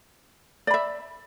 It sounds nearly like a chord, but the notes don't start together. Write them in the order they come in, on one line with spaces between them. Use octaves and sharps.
D5 B5 E5